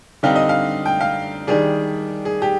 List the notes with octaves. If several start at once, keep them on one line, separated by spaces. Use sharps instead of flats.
D3 G3 C4 D#4 F5
D#5
F5
G5
F5
D#3 G3 D4 G#4
G#4
G4